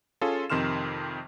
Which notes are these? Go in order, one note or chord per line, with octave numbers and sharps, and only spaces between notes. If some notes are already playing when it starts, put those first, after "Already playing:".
C#4 F4 G#4 A4
F2 C3 D#3 C6 F6 E7